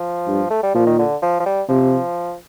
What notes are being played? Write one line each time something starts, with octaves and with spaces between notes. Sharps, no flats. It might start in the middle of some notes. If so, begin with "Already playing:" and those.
Already playing: F3
G2
A3
G3
A#2 F3
D#3
D3
F3
F3
G3
C3 F3